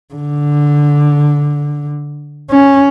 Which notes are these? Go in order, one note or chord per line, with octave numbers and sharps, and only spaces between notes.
D3
C#4